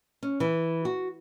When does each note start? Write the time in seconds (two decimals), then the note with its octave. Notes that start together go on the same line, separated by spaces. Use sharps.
0.23 C#4
0.40 E3
0.85 F#4